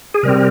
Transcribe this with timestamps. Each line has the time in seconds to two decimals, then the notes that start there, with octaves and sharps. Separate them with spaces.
0.14 G#4
0.23 C3 G3 C4 A#4